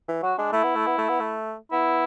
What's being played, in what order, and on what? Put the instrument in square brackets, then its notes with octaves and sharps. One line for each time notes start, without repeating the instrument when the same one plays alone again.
[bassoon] E3
[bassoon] F#3 [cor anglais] F#4
[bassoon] G#3 [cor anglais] D4
[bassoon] A3 [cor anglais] E4
[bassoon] B3
A3
B3
A3
B3
A3
[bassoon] B3 [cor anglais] E4